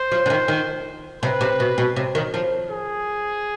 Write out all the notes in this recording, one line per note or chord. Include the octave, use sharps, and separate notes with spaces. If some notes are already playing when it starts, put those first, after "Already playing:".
Already playing: C5
F3
D3
D#3
D#3
C3 B4
C3
B2
B2
C3
D#3
F3
G#4